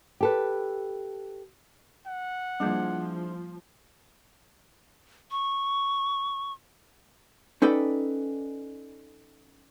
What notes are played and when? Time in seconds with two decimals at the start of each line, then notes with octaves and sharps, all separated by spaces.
0.21 G4 A4 B4
2.06 F#5
2.60 F3 G3 A#3 D4 E4 G#4
5.31 C#6
7.62 C#4 D#4 A4 B4 D5 G5